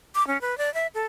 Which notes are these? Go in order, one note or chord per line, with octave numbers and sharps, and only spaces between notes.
D6
C#4
B4
D5
E5
A4